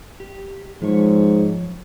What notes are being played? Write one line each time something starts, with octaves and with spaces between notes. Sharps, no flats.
G4
G#2 F3 C#5